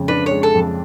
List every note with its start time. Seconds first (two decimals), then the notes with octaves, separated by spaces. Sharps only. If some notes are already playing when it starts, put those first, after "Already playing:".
Already playing: F2 C#3 G#3
0.08 D4 B4
0.26 G#3 C#5
0.43 A4
0.54 F2